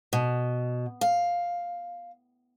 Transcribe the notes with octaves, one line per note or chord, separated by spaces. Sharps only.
B2
F5